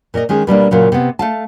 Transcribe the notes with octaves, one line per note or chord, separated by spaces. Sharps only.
A#2 A#4 C#5 D#5
D#3 G#3 C#4 G#4
B2 G3 A#3 D4
A#2 C#3 F#3
C3 B3
A3 F5 A5